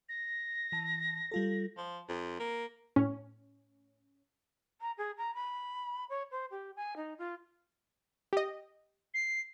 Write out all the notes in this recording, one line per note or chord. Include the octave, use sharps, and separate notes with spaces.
A#6
E3 A5
G3 F4 A4
F3
F2
A#3
A2 C#4
A#5
G#4
A#5
B5
C#5
C5
G4
G#5
D#4
F4
G4 D#5
C7